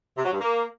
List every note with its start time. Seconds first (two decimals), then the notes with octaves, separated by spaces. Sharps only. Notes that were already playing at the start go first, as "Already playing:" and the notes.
0.16 C3
0.24 F#3
0.32 G2
0.40 A#3